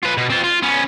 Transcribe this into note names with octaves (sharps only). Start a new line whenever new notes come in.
F4 B4
B2
C4 F4
F4
B3 C#4